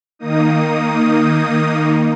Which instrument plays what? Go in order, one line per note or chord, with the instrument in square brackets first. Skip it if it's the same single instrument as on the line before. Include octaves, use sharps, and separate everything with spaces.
[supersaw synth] D#3 A#3 D#4 D#6